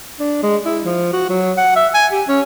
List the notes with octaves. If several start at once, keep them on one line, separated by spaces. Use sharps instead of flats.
D4
G#3
E4
F3
F#4
F#3
F#5
E5
G#5
G4
C#4